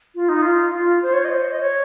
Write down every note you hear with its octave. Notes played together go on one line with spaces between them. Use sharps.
F4
D#4
F4
F4
C5
C#5
D#5
C5
D#5
C#5